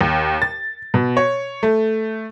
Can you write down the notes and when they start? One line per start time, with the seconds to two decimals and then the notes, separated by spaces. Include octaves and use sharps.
0.01 D#2
0.42 A6
0.94 B2
1.17 C#5
1.63 A3